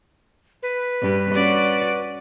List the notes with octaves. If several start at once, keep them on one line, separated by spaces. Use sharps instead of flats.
B4
G2
C#4 F#4 D5